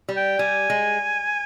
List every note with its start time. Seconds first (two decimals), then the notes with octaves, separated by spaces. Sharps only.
0.09 G3
0.17 G5
0.39 G3 G#5
0.70 G#3